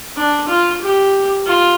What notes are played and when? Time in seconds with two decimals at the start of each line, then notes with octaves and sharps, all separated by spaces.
0.17 D4
0.48 F4
0.81 G4
1.46 F4